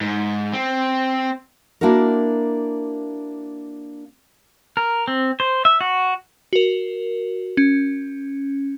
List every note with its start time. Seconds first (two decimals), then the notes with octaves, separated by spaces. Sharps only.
0.01 G#2
0.53 C4
1.81 A#3 D4 E4 F#4 A#4
4.77 A#4
5.08 C4
5.40 C5
5.65 E5
5.81 F#4
6.53 F#4 A#4
7.57 C#4